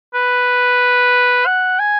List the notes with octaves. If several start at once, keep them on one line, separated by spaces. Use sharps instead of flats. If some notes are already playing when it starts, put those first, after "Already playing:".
B4
F#5
G#5